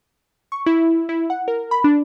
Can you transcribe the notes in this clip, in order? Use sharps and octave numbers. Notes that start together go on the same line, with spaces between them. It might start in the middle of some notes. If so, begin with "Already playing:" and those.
C#6
E4
E4
F#5
A#4
B5
D4